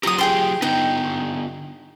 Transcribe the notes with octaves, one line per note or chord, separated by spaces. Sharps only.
F#3 F4 G4 A#5 D#6
G#4 G5 C6
D3 B3 D#4 G5